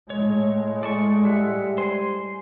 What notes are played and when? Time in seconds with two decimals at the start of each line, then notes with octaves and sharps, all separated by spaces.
0.10 A2 G#3 C#5
0.83 D5 A5 C#6
1.25 G3 E5 F#5
1.78 C5 G#5 C6